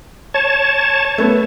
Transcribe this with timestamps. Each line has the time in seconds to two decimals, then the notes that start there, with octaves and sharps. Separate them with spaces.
0.34 C#5 A5
1.18 A3 B3